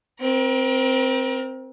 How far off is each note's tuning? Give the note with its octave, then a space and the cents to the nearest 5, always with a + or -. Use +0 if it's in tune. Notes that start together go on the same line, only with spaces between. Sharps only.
C4 +0 A#4 +35